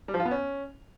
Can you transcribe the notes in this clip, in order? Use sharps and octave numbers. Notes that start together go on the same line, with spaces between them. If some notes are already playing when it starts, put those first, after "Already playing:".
G3
F3
F4
B3
C#4